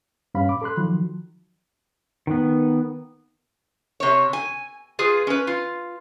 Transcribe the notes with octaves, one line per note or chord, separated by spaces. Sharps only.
G2 C#4 F5 B5
A#2 D6
A4 B5 C6 F#6
D#3 F3 F#3
D#3 B3
C3 C#5
G#5
F4 G#4 B4
C#4 B4
F4